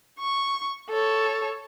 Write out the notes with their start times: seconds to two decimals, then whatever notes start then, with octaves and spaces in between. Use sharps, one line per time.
0.19 C#6
0.90 A4 C#5